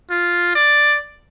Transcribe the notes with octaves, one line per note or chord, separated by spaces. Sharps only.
F4
D5